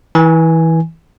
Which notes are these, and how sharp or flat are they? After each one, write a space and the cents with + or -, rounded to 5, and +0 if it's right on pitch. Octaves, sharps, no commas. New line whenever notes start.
E3 -25 G#5 +0